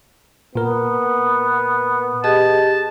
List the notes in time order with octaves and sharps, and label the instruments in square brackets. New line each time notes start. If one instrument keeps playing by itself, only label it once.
[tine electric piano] A#2 A#4 [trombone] B3
[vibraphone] G4 G#4 D#5 [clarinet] A5